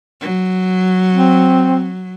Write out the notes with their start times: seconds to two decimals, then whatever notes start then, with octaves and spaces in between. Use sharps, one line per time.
0.21 F#3
1.15 C4